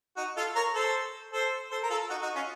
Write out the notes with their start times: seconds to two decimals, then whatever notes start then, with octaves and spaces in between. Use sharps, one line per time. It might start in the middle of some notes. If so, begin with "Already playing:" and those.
0.17 D#4 F#4
0.37 F4 A4
0.56 A#4 C#5
0.74 A4 C5
1.32 A4 C5
1.71 A4 C5
1.83 A#4
1.90 F4 A4
2.10 D#4 F#4
2.22 D#4 F#4
2.35 C#4 F4